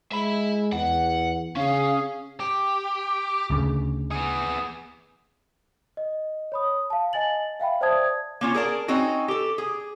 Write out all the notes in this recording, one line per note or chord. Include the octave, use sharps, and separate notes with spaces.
G#3 E5 B5
E2 F#5
C#3 C#4 G#4 F5
G4
D2 C#3
B3 G#4
D#5
C#5 B5 D#6
F5 A5
D#5 G#5 A6 F#7
E5 F5 G5 B5
C5 D5 E5 A5 D#6 G#6
A#3 C#4 F4
G#4 A#4 D5 A5
C4 C#4 D#4 F#4
G4 A4
G#4